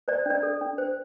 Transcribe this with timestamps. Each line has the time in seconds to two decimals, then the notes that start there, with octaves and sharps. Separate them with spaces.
0.08 C5 D5
0.26 D4 D5
0.43 A4
0.61 D4
0.78 C5